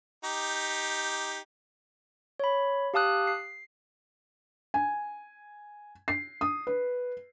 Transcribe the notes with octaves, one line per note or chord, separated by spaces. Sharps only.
D#4 G4
C#5 B5
G4 F5 A5 D#6 F#6
C7
G#5
C7
D#6
B4